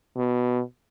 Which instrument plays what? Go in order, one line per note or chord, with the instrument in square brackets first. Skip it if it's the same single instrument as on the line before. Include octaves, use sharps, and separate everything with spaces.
[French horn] B2